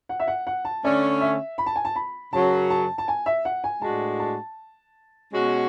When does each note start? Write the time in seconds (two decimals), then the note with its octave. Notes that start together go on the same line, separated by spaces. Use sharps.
0.09 F#5
0.20 E5
0.28 F#5
0.47 F#5
0.65 A5
0.84 D3 A3 C#4 D5
1.21 E5
1.58 B5
1.66 A5
1.76 G#5
1.85 A5
1.96 B5
2.33 F#2 C#3 F#3 A5
2.70 A5
2.98 A5
3.08 G#5
3.26 E5
3.45 F#5
3.64 G#5
3.82 A2 G#3 D4 F#4 A5
4.20 A5
5.32 B2 G#3 C#4 F#4